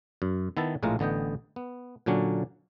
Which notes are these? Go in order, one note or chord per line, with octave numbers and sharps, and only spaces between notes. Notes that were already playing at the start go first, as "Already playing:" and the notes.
F#2
D#3 B3 E4 E5 A5
A#1 A2 G#3 A3 F4 A#4
A1 D3 B3 D#5 G5
B3
A#2 D3 F#3 C#4 D4